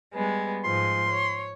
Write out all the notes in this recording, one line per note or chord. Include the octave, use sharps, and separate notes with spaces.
G3 G#3 B3
G#2 F3 G#3 C6
C#5